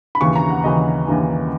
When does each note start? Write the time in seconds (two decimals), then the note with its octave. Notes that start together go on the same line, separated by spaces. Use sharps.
0.15 B5
0.21 D#2 C#3 E3 C#6
0.35 A#5
0.50 F#5
0.64 D#2 C#3 E3 D#5
1.07 D#2 C#3 E3